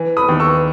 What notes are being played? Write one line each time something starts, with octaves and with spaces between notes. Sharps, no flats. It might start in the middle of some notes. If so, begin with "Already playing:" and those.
Already playing: E3
B5 D#6
D#2
C#6 E6